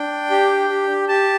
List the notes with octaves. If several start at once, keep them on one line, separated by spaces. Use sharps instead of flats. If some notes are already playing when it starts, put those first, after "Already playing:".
Already playing: D4 G5
G4
G4
G4 A5